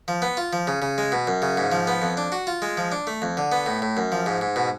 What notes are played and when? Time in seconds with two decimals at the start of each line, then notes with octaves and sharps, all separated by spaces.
0.08 F3
0.22 B3
0.37 F4
0.53 F3
0.67 C#3
0.82 C#3
0.98 G#3
1.12 B2
1.27 F#2
1.42 C#3
1.57 G#2
1.72 F3
1.87 B3
2.02 F2
2.17 D4
2.32 F#4
2.47 F4
2.62 G#3
2.77 F3
2.92 D4
3.07 A3
3.22 F2
3.37 D3
3.52 B3
3.66 A2
3.82 A2
3.97 F#2
4.12 F3
4.26 G#2
4.41 G#2
4.56 B2